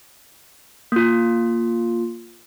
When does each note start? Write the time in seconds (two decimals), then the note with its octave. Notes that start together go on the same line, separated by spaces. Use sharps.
0.92 A#3 F4